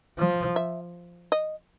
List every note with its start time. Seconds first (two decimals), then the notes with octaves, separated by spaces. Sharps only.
0.18 F3
0.56 E5
1.32 D#5